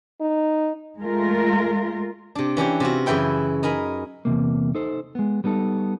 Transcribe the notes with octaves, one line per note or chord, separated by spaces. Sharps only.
D#4
G#3 A3 F4 A#4
C3 D4
E3 C#4 D4 G4
C3 F4 F#4
F#2 C#3 E3 E4 G5 B5
D#4 A#4 G#5 B5
E2 G#2 C3 A#3
D#4 A4 C5
G#3 B3
G3 B3 D#4 A4